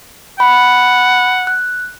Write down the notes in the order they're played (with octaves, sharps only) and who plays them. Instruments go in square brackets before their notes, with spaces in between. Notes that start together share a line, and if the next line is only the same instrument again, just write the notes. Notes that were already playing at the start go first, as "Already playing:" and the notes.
[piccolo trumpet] F#5 [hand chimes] B5
[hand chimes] F#6